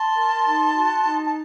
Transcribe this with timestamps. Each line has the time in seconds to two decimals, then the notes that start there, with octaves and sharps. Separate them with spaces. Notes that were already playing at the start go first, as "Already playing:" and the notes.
Already playing: A5 C6
0.15 A#4
0.46 D#4
0.74 F#4
1.03 D#4
1.26 A5